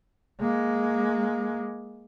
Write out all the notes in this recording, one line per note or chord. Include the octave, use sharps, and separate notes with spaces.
G#3 A#3